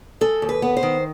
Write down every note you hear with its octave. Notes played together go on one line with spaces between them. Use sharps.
G#3 A4
D#2
B4
B3
C5
D#3